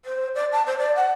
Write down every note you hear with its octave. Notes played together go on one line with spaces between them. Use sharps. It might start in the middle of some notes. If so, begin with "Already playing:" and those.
C5
D5
A5
C5
D5
F#5